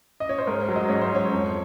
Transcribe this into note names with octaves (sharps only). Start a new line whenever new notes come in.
D#5
C#5
C5
G#2 A#4
C5
F#3
D#5
G#2 C#5
C5
F#3 C#5
F2